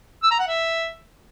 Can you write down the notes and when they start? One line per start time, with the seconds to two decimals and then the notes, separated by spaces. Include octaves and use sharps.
0.23 E6
0.31 A#5
0.39 F#5
0.47 E5